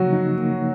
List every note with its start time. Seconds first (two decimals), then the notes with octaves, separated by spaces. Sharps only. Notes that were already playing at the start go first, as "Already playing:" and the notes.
Already playing: C#3 F3 F#3 A#3 D#4 F#4
0.13 D#4
0.38 A#3